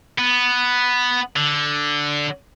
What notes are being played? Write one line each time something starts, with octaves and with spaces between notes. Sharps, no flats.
B3
D3